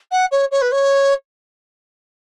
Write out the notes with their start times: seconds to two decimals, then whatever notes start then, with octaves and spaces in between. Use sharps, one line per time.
0.11 F#5
0.31 C#5
0.51 C#5
0.61 B4
0.72 C#5